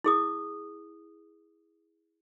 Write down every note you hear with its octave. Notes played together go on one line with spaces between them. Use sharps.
E4 G#4 D#6